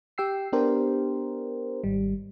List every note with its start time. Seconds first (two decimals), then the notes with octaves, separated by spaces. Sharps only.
0.18 G4 G5 E6 C7
0.52 B3 D4 G4 A#4 C5
1.84 G#1 G3